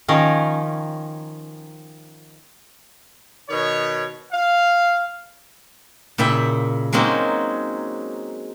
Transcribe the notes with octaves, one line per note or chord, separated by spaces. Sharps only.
D#3 F3 C#4 A#4
B2 D#3 C#5
F5
A#2 C#3 E4 G5
F#3 G#3 A#3 C4 C#4 D#4